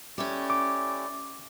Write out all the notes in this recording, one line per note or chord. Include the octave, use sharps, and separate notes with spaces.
A3 C#4 E4 G4 D5
D6